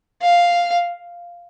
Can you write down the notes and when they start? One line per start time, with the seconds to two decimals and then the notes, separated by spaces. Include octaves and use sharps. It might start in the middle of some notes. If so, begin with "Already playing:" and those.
0.22 F5